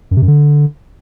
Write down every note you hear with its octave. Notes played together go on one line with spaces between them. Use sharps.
F#2
C3
F#2
D3